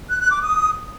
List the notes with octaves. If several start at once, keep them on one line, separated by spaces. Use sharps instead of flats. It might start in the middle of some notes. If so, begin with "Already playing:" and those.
F#6
F#6
D6
D#6